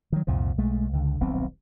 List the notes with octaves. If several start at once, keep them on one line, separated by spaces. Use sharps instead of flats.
D#3 F#3
C2 F2 A#2 F3
B1 G#3 A3
C#2 D3
D#1 B1 B3 C4